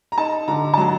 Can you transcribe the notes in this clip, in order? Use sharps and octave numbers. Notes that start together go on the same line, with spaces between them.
A#5
D#4 A5
D3 A#5
A5
F#3 A#5